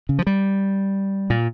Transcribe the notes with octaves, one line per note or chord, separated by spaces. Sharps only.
C#3
F3
G3
A#2